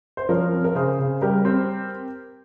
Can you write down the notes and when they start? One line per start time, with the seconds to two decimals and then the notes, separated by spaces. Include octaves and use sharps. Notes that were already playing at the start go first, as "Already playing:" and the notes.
0.17 C5
0.29 F3 A#4 C#5
0.53 C4
0.64 A#4
0.75 C#3 G#4 C5
0.99 C#3
1.22 G3 G4 A#4
1.45 C4